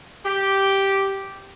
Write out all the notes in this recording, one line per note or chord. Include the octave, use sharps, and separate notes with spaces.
G4